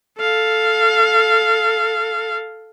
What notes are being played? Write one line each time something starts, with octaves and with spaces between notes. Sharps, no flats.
A4 F5